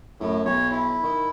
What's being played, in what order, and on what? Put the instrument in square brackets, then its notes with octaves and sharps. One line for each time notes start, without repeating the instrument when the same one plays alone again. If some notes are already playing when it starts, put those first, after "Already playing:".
[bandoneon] F#2 [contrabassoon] A2
[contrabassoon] B1 [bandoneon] C#5
[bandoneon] E4
[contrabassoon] D#3